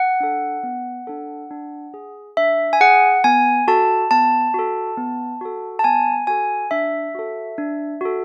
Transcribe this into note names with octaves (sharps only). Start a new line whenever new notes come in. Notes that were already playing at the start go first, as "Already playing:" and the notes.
Already playing: F#5
D4 A4
B3
D4 A4
D4
G#4
D4 E5
G#5
G#4 F#5
B3 G#5
F#4 A4 A5
B3 A5
F#4 A4
B3
F#4 A4
A5
B3 G#5
F#4 A4 G#5
D4 E5
F#4 A4
D4
F#4 A4